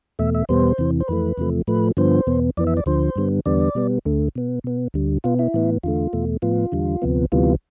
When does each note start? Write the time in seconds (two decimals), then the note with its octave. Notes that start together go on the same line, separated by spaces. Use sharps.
0.19 E2 B2 A3 E5
0.34 E5
0.49 E2 B2 G3 B3 C5
0.78 E2 C3 E3
1.00 C5
1.08 F2 E3 A3 B4
1.37 E2 C3 F3 A3
1.67 A2 F3 A3 B4
1.97 G2 D3 F3 B3 C5
2.27 E2 B2 B3
2.57 F2 E3 B3 D5
2.67 E5
2.77 D5
2.86 D2 D3 F3 C5
3.16 G2 D3 G3 B3
3.46 E2 D3 G3 B3 D5
3.75 B2 G3 B3
4.05 D2 D3 A3
4.35 B2 B3
4.64 B2 B3
4.94 D2 D3 G3
5.24 B2 B3 F4
5.39 E4
5.54 A2 E3 B3
5.83 E2 D3 A3 F4
6.13 E2 B2 A3
6.42 A2 F3 B3 F4
6.72 E2 D3 G3
7.02 D2 C3 F3 B3
7.32 D2 C3 E3 G3 B3 F4